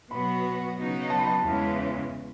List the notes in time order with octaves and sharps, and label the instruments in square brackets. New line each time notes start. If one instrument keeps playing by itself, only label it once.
[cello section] B2 F#3 B3 F#4 [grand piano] B5
[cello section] C#3 F#3 B3 D#4 F#4
[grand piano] A5
B5
A5
[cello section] E2 C#3 E3 G#3